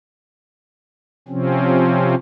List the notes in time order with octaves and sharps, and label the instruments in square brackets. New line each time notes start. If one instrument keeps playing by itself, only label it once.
[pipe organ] C3 F3 C4 C#4